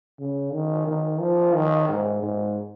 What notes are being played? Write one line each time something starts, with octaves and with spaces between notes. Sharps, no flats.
C#3
D#3
D#3
F3
D#3
G#2
G#2